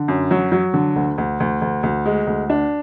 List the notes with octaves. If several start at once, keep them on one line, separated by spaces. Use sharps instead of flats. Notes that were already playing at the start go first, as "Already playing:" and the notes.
Already playing: D3
F#2
F#3
F#3
D3
D2
D2
D2
D2
D2
G#3
D2
D4